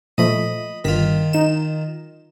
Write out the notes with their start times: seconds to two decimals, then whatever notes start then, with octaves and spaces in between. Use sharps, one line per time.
0.18 A#2 F3 A3 D#5 B5
0.85 G1 G2 D#3 F4 B6
1.33 D#4 E7